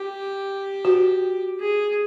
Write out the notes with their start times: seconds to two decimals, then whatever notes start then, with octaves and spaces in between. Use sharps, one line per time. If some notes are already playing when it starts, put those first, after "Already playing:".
Already playing: G4
0.85 F#4
1.60 G#4